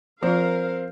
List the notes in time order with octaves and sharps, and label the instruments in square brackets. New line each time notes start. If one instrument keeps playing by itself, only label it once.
[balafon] F3 F4 [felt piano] C4 [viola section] A#4 F5